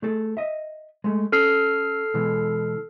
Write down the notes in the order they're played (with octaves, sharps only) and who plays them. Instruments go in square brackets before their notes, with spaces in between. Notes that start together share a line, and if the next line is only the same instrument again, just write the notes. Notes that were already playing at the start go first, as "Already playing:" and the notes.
[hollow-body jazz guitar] A3 G#4 A4
D#5 E5
G#3 A3
[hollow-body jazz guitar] C#4 [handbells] A4 F6 C7
[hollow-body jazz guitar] B2 E3 G#3